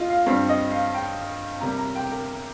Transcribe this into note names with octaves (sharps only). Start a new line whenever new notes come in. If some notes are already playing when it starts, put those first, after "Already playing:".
Already playing: F4 D#5
F5
G2 G3 C4 F5
D#5
F5
G5
C3 G3 A#3 A#5
A#5
G5
A#4